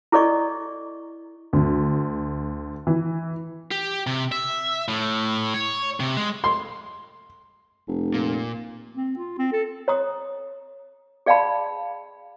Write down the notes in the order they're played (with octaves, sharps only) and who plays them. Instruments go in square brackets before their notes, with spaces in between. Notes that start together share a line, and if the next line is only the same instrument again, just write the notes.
[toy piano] E4 G#4 A4 D5 D#5 C#6
[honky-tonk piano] D2
E3
[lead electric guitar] G4
C3
E5
A2
C#5
C3
G#3
[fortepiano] C6
[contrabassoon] F1
[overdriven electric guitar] A#2
[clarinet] C4
F4
C4
A4
[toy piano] C#5 A#5 D#6
G#4 D5 F5 G5 A5 B5